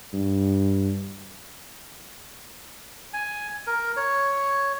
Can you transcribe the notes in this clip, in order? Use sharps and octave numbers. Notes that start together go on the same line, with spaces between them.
G2
G#5
A#4
C#5